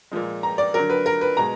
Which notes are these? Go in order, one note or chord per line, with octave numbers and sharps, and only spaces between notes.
A#2 F3 G#3
A#5
D5
D3 F#3 A#4
B4
A#4
B4
B2 G#3 A#5